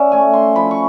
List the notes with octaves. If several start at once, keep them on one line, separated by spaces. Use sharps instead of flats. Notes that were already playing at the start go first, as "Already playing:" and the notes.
Already playing: C#4 D5 E5
A3 G#5
C6
F3 B5
C#6